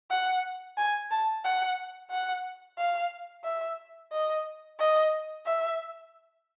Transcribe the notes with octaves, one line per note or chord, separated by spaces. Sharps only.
F#5
G#5
A5
F#5
F#5
F5
E5
D#5
D#5
E5